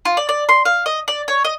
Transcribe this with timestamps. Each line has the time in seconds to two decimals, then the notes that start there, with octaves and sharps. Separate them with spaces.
0.05 F4
0.17 D5
0.29 D5
0.49 C6
0.65 F5
0.86 D#5
1.08 D5
1.28 C#5
1.45 D#5